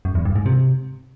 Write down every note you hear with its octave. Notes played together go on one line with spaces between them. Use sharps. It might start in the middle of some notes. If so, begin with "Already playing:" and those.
F#2
E2
G2
G#2
C3